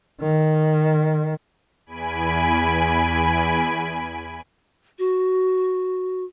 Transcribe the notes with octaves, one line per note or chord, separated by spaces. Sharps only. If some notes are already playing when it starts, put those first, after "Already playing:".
D#3
E2 G#5 B5 D7
F#4